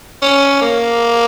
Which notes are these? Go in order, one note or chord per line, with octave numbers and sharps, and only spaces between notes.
C#4
A#3